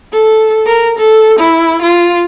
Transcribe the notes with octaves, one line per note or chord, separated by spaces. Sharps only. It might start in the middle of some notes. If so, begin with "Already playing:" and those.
A4
A#4
A4
E4
F4